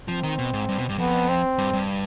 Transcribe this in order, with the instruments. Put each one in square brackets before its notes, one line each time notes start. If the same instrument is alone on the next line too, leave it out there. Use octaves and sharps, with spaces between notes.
[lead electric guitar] F3 [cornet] C4
[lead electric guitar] D#3
B2
G#2
G2
B2
G2
[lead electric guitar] F2 [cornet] B3
[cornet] C4
[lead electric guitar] G2
G2